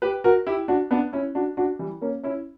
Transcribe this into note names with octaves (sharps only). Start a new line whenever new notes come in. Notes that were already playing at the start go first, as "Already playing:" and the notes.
G4 B4
F#4 A#4
E4 G4
D4 F#4
B3 D4
C#4 E4
D4 F#4
D4 F#4
E3 G3
A#3 C#4
C#4 E4